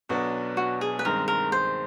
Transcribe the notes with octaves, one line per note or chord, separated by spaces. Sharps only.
B1 B2 F#3 B3 D4 F#4
F#4
G#4
B4
G2 D#3 G#3 C4 A#4
A#4
C5